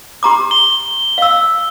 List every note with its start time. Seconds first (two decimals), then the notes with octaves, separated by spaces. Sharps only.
0.23 G4 A#5 D6
0.51 G7
1.18 F5 E6